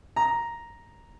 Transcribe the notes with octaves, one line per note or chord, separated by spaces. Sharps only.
A#5